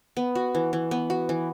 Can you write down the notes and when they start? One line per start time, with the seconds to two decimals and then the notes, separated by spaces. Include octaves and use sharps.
0.17 B3
0.35 F#4
0.55 E3
0.73 E3
0.91 B3
1.10 F#4
1.29 E3